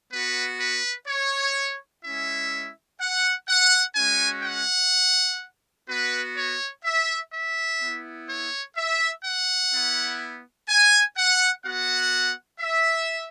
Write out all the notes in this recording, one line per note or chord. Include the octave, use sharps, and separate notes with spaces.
B3 F#4 B4
B4
C#5
G#3 C#4 E4 E5
F#5
F#5
G#3 C#4 F#4 G#5
F#5
B3 F#4 B4
C#5
E5
E5
B3 E4
C#5
E5
F#5
B3 E4
G#5
F#5
B3 F#4 F#5
E5